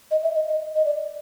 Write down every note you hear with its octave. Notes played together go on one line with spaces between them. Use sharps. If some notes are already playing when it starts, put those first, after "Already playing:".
D#5
E5
D#5
D#5
D#5
D5